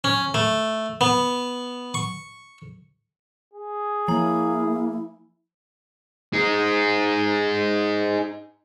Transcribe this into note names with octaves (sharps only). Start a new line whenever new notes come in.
C#4
A3
B3
C#6
G#4
F3 A#3 E4 A#5
D#4 G#4